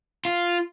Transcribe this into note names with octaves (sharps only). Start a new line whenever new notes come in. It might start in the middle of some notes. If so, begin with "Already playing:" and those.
F4